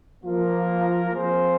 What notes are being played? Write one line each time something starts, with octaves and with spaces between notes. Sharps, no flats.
F3 A#3 F4 A#4
F3 C4 F4 G#4 C5